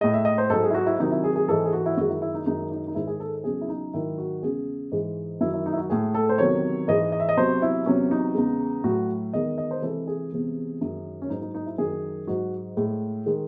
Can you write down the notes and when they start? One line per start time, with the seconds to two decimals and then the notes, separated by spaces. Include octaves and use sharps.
0.01 A2 G#3 D#5
0.14 E5
0.25 D#5
0.38 C5
0.50 G#2 F#3 A4
0.63 G#4
0.70 E4
0.74 F#4
0.86 E4
0.99 C3 D#3 F#3 D#4
1.11 E4
1.24 G#4
1.36 G#4
1.48 G#2 E3 G#3 A4
1.65 G#4
1.73 F#4
1.86 E4
1.97 F#2 D#3 G#3 F#4
2.10 E4
2.22 E4
2.34 D#4
2.46 F#2 D#3 G#3 D#4
2.71 D#4
2.87 D#4
2.95 G#2 D#3 G#3 E4
3.07 G#4
3.20 A4
3.44 E2 C#3 F#3 G#4
3.61 E4
3.69 D#4
3.94 G#2 D#3 F#3 E4
4.18 F#4
4.42 E2 C#3 G#3 G#4
4.92 G#2 E3 G#3
5.40 F#2 D#3 F#3 E4
5.54 E4
5.66 D#4
5.73 E4
5.77 F#4
5.90 A2 G#3 G#4
6.15 A4
6.29 C5
6.38 E2 C3 D#3 F#3 C#5
6.88 G#2 E3 G#3 D#5
7.12 D#5
7.20 E5
7.29 D#5
7.37 E2 C3 F#3 C5
7.62 E4
7.86 E2 C3 F#3 C#4
8.11 D#4
8.35 E2 C#3 G#3
8.84 A2 F#3 F#4
9.33 E2 D#3 G#3 D#5
9.58 D#5
9.71 C5
9.82 C3 E3 G#3 A4
10.07 G#4
10.32 E2 C3 E3 G#3
10.81 F#2 D#3 G#3
11.22 C#4
11.29 G#2 F#3 D#4
11.42 D#4
11.54 D#4
11.66 E4
11.78 F#2 D#3 F#3 G#4
12.27 G#2 F#3 F#4
12.77 A2 G#3
13.26 D#3 G#3